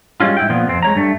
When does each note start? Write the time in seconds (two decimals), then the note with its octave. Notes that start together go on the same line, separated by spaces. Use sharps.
0.20 G3 G#3 C#4 F4
0.37 G#2 E4 G5
0.49 A#2 F3 B3
0.67 F2 C4
0.82 G#3 C#5 A#5
0.96 G2 A3